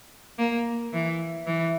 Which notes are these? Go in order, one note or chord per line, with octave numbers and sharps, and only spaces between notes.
A#3
E3
E3